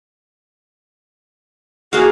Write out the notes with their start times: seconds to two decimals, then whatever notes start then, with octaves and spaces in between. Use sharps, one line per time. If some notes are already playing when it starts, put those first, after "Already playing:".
1.93 A#3 F#4 G#4 F5